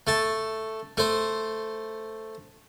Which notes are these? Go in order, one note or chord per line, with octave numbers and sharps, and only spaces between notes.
A3 A5
A3 C5